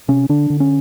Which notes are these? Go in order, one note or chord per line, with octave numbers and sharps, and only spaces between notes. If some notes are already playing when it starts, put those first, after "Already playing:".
C3 C#4
D3 D4
D3
C#4